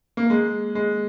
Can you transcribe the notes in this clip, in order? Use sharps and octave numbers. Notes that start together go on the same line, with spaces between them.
A#3
G#3
G#3